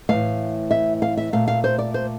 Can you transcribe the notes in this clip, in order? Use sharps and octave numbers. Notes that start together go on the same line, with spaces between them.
A2 E3 A3 F5
E5
F5
E5
A#2 A3 F5
F5
C5
D5
C5